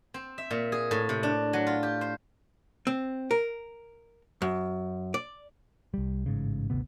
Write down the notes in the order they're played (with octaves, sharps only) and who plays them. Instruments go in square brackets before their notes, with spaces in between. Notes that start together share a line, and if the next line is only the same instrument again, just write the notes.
[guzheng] C4
E5
A#2
G#4
A2
C3
D4
F#3
F4
G4
C5
[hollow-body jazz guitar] C4
A#4
F#2
D5
[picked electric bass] C2 G3
A1 G#2 C#3
G#1 D2 C3 B3